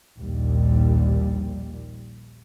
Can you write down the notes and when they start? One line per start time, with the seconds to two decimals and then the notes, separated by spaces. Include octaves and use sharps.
0.18 A#1 D#2 A#2 G3